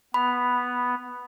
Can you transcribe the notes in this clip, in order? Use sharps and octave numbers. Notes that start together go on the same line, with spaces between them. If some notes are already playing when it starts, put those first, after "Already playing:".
B3 B5